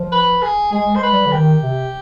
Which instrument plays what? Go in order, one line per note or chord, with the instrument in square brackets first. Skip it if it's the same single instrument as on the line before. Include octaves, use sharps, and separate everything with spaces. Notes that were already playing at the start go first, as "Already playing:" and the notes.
Already playing: [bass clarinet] F3
[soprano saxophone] B4
G#4
[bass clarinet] G#3 [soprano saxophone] G#4
[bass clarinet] G#3 [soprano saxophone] C5
[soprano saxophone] B4
[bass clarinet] G3
D3
[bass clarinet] D#3 [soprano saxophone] G4
[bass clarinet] C3